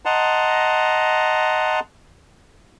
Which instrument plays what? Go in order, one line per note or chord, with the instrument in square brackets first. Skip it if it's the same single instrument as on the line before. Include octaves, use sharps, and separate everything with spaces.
[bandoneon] D#5 F#5 A5 A#5 C6